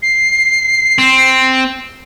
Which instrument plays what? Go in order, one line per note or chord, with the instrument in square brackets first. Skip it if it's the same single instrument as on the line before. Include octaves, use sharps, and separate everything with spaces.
[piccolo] C7
[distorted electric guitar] C4